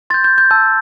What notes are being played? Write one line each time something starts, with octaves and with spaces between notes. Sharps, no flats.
C6 G6 A6
G6
G6
A5 E6 G6